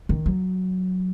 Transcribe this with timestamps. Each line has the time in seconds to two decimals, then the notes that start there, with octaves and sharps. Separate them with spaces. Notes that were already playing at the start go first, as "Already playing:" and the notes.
0.09 D#3
0.26 F#3